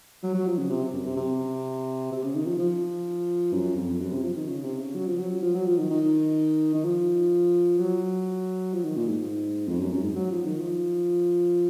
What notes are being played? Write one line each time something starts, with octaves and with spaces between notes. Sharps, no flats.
F#3
F#3
F3
C#3
C3
F#2
C3
C3
C3
C#3
D#3
F3
F3
F#2
F2
F#2
C3
F3
D#3
C#3
C3
C#3
F#3
F3
F#3
F#3
F3
F#3
F3
D#3
D#3
D#3
F3
F#3
F3
D#3
A#2
G#2
F2
F#2
F#2
G#2
F#3
F3
D#3
F3